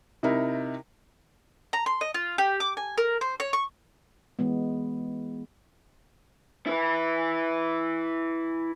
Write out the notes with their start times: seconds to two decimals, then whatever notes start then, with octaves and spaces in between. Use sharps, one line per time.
0.23 C3 D#4 E4 A#4
1.73 A#5
1.86 C6
2.01 D#5
2.14 F4
2.38 G4
2.60 D6
2.77 G#5
2.98 A#4
3.21 C5
3.40 C#5
3.53 C#6
4.39 E3 G#3 B3
6.66 E4 B4